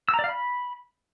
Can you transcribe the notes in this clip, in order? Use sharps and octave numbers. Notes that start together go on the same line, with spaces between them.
E6
A#5
D5
F5
B5